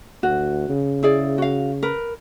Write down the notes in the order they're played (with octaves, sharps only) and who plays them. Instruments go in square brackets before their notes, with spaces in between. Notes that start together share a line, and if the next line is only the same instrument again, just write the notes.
[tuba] D2 [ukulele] F#4
[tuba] C#3
[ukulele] E4 G#4 D5
F#4 F5
A#4 B4